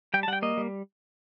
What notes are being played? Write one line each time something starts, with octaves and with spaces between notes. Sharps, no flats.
G3 G5
A5
G3 F#5
G5
A#3 D#5
G3